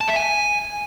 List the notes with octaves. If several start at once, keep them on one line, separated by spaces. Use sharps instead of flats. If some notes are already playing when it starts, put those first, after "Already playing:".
A5
E5
G#5